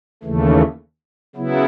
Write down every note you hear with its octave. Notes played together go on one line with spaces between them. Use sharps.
D#2 C#3 E3 A3
C#3 F#3 B3 E4